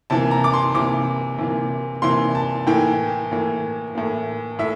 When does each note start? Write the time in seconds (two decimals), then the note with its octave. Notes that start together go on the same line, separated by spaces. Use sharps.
0.10 C3 E3 A#3 A5
0.31 A#5
0.44 D6
0.53 C6
0.75 C3 E3 A#3 D6
1.39 C3 E3 A#3
2.02 C3 E3 A#3 C6
2.35 A5
2.67 A2 E3 A#3 G5
3.32 A2 E3 A#3
3.95 A2 E3 A#3
4.59 A2 E5